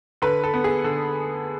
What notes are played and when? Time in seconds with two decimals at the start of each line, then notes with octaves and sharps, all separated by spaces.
0.22 D3 B4
0.44 A4
0.54 B3
0.64 G#4
0.84 D3